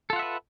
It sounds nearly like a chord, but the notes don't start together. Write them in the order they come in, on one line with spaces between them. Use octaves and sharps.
A4 F4 F#5 E5 B4